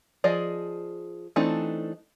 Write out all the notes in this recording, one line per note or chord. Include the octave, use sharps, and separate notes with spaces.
F3 G#4 D5 D#5
E3 A3 C4 D4 D#4